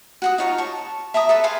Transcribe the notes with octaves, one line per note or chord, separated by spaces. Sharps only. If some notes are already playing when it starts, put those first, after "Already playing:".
F#4 F#5 D#6
D#4 F4 C#5 A#5
A5 C#6
E5 A5 A#5 D#6
A4 B4 E5
G#4 B4 F5 C6